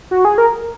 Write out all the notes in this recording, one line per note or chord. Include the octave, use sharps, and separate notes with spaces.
F#4
G#4
A#4